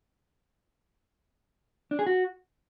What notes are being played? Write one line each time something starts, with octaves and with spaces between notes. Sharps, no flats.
D4
G#4
F#4